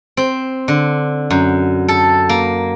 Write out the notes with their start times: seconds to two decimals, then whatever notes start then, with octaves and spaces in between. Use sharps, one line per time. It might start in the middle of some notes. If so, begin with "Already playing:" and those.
0.17 C4
0.68 D3
1.30 F#2
1.88 A4
2.29 A#3